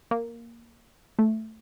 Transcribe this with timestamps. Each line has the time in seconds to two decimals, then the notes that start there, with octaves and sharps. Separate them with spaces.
0.11 A#3
1.19 A3